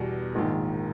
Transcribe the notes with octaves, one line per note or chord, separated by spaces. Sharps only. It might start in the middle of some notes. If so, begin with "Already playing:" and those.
Already playing: E2 B2 G3
A#1 G#2 D#3